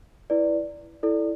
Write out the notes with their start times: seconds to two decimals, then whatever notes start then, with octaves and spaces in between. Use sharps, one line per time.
0.30 E4 B4 D5
1.03 E4 A4 D5